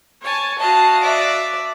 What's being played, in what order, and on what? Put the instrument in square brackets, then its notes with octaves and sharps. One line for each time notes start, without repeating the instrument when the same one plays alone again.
[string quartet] C#5 G#5 A5
[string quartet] F#4 D#5 F5 [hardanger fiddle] A5
[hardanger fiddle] D5 E5